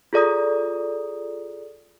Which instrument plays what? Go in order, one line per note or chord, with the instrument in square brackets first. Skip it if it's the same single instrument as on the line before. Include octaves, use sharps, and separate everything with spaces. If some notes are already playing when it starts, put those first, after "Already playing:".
[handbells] F4 G#4 A4 D5 A#5 D#6